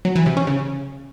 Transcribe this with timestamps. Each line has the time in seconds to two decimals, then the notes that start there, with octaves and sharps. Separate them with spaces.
0.05 F#3
0.16 E3
0.26 C3
0.37 C#4
0.47 C#3